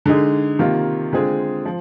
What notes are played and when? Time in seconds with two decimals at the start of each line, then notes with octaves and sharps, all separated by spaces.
0.06 D3 G#3 D#4 G#4
0.59 C3 D#3 A#3 F4
1.13 D3 G#3 C4 F4 G#4
1.65 F3